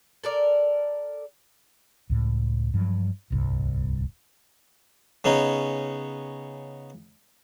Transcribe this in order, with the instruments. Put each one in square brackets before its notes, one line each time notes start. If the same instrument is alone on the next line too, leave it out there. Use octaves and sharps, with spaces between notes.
[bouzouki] A4 A#4 D5
[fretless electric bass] C#2 A2
G2 F3 F#3
D1 C2 G2
[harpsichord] C#3 B3 C#4 D#4